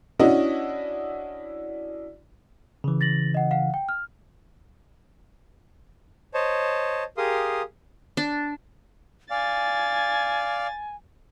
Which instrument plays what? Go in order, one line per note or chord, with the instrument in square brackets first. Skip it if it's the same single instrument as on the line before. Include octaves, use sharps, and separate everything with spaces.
[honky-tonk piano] C#4 D4 E4 F#4 D#5
[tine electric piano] C#3 E3
[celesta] A6 A#6 F#7
D#5 F#5
F5 F#5
G5
F6
[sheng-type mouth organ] C5 C#5 D#5 A5
G4 G#4 A#4 F5 C6 D#6
[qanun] D4
[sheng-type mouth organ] D5 F5 [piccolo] G#5 [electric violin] A6